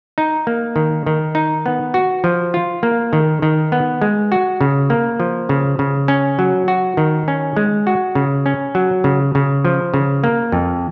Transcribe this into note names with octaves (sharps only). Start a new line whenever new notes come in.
D#4
A#3
D#3
D#3
D#4
B3
F#4
F3
F4
A#3
D#3
D#3
B3
G#3
F#4
C#3
A#3
F3
C#3
C#3
C#4
F#3
F#4
D#3
C#4
G#3
F#4
C#3
C#4
F#3
C#3
C#3
F3
C#3
A#3
F2